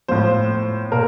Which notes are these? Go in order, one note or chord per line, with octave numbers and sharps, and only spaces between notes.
A2 F3 C5
A#2 A#4